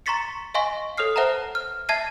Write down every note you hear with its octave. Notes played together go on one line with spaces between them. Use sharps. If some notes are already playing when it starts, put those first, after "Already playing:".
A#5 C6 C#6 A6 B6 C#7
D#5 F5 G#5 C6 C#6 A#6
A4 C#5 D#6 F6 C7
B4 C5 E5 F#5 A5 A#5
F6
E5 A5 G#6 A6 C7 D#7